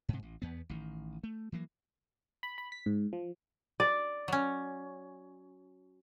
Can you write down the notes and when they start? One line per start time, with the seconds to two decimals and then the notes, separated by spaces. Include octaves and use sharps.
0.09 G#2 C3
0.23 A1
0.42 E2 B3
0.69 A1 D#3
1.23 A3
1.52 E3 F#3 A#3
2.43 B5
2.58 B5
2.72 B6
2.86 G#2
3.13 F3
3.80 D5
4.28 F#3 C#4